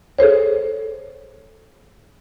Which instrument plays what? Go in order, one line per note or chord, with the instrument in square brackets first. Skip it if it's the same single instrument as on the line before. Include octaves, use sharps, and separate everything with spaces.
[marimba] G#4 A4 C5 C#5